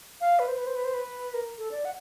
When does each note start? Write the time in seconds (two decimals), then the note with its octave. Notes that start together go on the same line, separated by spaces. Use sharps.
0.21 F5
0.39 B4
0.48 C5
0.58 B4
0.67 C5
0.75 B4
0.84 C5
0.94 B4
1.34 A#4
1.58 A4
1.71 D5
1.85 F#5